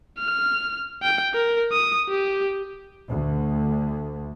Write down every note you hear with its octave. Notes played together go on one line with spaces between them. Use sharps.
F6
G5
A#4
D#6
G4
D2